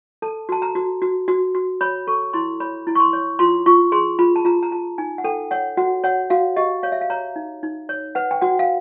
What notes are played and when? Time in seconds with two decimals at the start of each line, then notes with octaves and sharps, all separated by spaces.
0.22 A4 A5
0.49 F#4 A5
0.62 A#5
0.75 F#4
1.02 F#4
1.28 F#4
1.55 F#4
1.81 C#5 B5
2.07 A4 C#6
2.33 E4 C6
2.60 C#5 B5
2.87 E4
2.95 C#6
3.00 C6
3.13 C#5
3.39 F4 C6
3.66 F4 C#6
3.92 G#4 C6
4.19 F4 B5
4.36 A5
4.45 F4 A#5
4.63 A#5
4.71 F4 A5
4.98 D#4 G#5
5.18 F#5
5.24 A4 G5
5.51 C#5 F#5
5.77 F#4 F#5
6.04 C#5 F#5
6.30 F#4 F5
6.56 G4 D#5
6.83 C#5 F5
6.92 E5
7.01 F5
7.10 C#5 A#5
7.36 D#4
7.63 D#4
7.89 C#5
8.15 B4 F#5
8.31 G5
8.41 F#4 F#5
8.59 F5